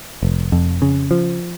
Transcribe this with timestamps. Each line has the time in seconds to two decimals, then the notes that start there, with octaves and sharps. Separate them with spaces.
0.23 F1
0.52 F2
0.82 C#3
1.11 F3